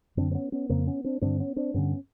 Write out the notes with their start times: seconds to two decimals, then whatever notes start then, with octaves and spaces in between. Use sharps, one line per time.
0.17 F#2 D3 C4 D4
0.31 C4
0.35 B3 C#4
0.52 B3 C#4
0.69 F2 C#3 A#3 C4
0.87 B3 C#4
1.04 C4 D4
1.21 G2 D3 C4 D4
1.40 B3 C#4
1.56 C4 D4
1.74 G2 D3 B3 C#4